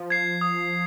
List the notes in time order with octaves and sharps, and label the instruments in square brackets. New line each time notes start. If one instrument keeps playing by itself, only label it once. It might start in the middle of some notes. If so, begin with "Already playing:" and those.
Already playing: [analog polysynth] F3
[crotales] G#6 C7
D#6